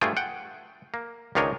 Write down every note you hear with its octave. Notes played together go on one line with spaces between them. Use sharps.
G2 A3 F4 G#4 G5
F#5 G5
A#3
C#2 D#3 D4 A#4 C#5 D#5